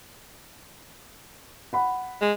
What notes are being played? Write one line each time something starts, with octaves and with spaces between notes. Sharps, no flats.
F#5 B5
G#3